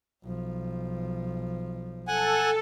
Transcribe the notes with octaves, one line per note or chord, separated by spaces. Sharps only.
B1 F3
A4 F#5 G#5